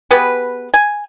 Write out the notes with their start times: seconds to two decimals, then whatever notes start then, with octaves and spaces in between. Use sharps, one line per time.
0.11 B3 G4 G#4 B4
0.74 G#5